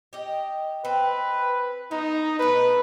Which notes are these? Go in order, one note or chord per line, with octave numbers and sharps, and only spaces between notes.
G4 D#5
C4 B4
B3 D#4
B2 A3 B4